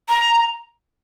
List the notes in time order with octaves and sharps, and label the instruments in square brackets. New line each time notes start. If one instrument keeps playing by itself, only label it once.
[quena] A#5